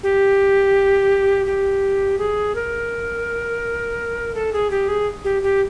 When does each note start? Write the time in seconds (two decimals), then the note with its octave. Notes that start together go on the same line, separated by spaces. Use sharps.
0.03 G4
1.46 G4
2.19 G#4
2.55 A#4
4.34 A4
4.53 G#4
4.70 G4
4.89 G#4
5.24 G4
5.42 G4